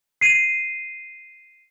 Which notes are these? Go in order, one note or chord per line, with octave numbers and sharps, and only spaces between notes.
C7 D#7